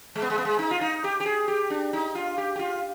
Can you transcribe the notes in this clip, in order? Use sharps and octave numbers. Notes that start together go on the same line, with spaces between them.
G#3
B3
G#3
B3
G#3
D#4
F4
D#4
G4
G4
G#4
G4
D4
D#4
F4
G4
G4
F4